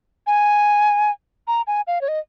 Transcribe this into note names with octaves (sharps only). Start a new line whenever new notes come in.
G#5
A#5
G#5
F5
C#5
D#5